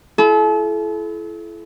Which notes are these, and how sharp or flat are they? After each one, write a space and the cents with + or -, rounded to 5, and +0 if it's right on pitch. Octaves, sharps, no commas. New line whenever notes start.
E4 +30 A4 -40